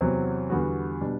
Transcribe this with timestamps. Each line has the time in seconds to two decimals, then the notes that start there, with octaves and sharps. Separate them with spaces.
0.01 E2 C3 F#3 C4
0.50 E2 D3 G3 B3 F#4
1.01 B2 G3 D4